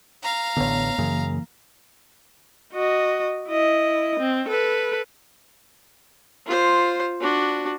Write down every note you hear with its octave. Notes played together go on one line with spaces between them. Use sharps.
F5 A#5
A1 D3 B3 C#5
F#2 C#3 E3 A#3
F#4 D#5
E4 D#5
C4
A4 B4
F4 C5
D4 F#4